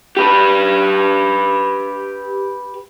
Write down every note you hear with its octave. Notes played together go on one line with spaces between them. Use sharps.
G4 B4